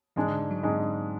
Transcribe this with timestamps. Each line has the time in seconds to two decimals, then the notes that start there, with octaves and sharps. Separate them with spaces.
0.16 G#2 E3 G#3 D4
0.28 D3
0.39 D3
0.51 F#3
0.63 G#2 G#3 D4